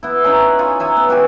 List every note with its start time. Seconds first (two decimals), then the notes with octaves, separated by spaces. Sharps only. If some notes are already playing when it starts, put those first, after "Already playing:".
0.03 B3 E4
0.24 C#4 D#4 F#5
0.59 F4 G#5 C#6
0.80 C#5 E5 G#5 A#5
0.97 B3
1.09 B3 F#4 G4 G#5